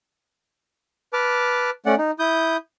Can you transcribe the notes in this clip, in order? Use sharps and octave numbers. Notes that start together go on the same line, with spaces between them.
B4 A5 D6 F6
A3 C#4 D5 F#5
D#4
E4 D#6 G6